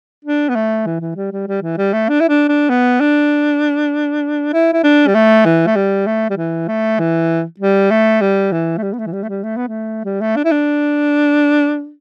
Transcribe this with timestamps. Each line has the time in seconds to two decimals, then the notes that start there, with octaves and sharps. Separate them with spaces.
0.25 D4
0.49 B3
0.55 A3
0.86 E3
1.00 E3
1.16 G3
1.32 G3
1.47 G3
1.62 E3
1.78 G3
1.93 A3
2.09 D4
2.20 E4
2.29 D4
2.49 D4
2.69 B3
3.00 D4
4.53 E4
4.73 E4
4.84 D4
5.07 G3
5.14 A3
5.45 E3
5.67 A3
5.76 G3
6.07 A3
6.30 G3
6.37 E3
6.68 A3
6.99 E3
7.59 G3
7.90 A3
8.21 G3
8.52 E3
8.77 A3
8.82 G3
8.93 B3
8.98 A3
9.06 E3
9.13 G3
9.23 A3
9.29 G3
9.43 A3
9.57 B3
9.68 A3
10.05 G3
10.21 A3
10.36 D4
10.45 E4
10.51 D4